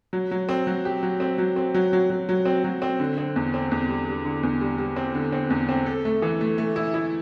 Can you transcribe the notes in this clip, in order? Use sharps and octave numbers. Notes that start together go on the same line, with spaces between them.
F#3
F#3
C4
F#3
G4
F#3
C4
F#3
C4
F#3
F#3
F#3
F#3
C4
F#3
C4
D3
C4
E2
C4
E2
G3
G3
D3
E2
G3
G3
C4
D3
C4
E2
C4
A4
A3
E3
A3
A3
E4
E4